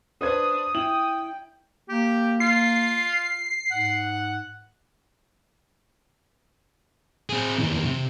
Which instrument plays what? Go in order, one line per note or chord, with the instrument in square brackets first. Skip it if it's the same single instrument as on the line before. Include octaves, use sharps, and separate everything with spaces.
[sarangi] D4 [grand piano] B4 C5 G#6 [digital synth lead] D#6
[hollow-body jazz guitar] E4 [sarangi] G5 [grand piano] F#7
[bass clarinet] A#3 [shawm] G4
[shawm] F4 [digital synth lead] C7
[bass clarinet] G#2 [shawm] F#5
[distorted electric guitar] C4 G#4
D#2 E3
C3